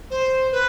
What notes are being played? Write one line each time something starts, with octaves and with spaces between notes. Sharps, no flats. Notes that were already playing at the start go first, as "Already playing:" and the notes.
C5
B4